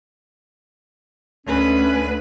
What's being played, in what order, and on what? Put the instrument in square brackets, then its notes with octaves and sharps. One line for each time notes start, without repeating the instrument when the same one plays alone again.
[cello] D2 B4 [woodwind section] C#4